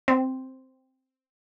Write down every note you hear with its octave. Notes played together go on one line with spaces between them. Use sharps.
C4